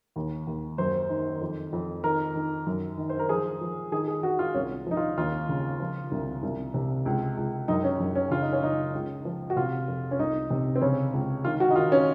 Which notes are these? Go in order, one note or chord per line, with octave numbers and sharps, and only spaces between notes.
D#2
D#2
F#2 C5
D#3
F2
F2
D#3 A#4
D#3
F#2
D#3
C5
A#4
F3 G#4
F3
D#3 G#4
G#4
D#3 F#4
F4
C2 C#4
F3 D#4
F4
D#2 F4
C#3
F3
C2
C2
C3
C#2
C#2
F#2 D#4
C#4
F#2
C#4
C#3 F4
D#4
C#4
C#3 D#4
C#2
F3
F#4
C3 F4
F2
C#4
C2 D#4
C3
C4
C#3 C#4
C#2
D#3 F4
F#4
D#4
D#3 F4
C#4